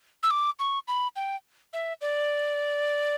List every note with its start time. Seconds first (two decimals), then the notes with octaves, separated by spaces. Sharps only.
0.23 E6
0.31 D6
0.59 C#6
0.88 B5
1.16 G5
1.73 E5
2.01 D5